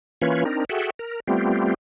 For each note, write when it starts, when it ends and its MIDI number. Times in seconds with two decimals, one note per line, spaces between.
0.22 0.44 52
0.22 0.44 58
0.22 0.44 61
0.22 0.44 65
0.22 0.44 71
0.22 0.44 73
0.45 0.65 60
0.45 0.65 62
0.45 0.65 63
0.45 0.65 70
0.69 0.90 66
0.69 0.90 68
0.69 0.90 69
0.69 0.90 76
0.69 0.90 78
0.69 0.90 79
0.99 1.20 70
1.27 1.74 55
1.27 1.74 57
1.27 1.74 59
1.27 1.74 60
1.27 1.74 65
1.27 1.74 67